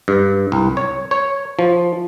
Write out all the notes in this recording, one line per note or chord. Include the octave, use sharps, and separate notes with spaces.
G2
C2
C#5
C#5
F3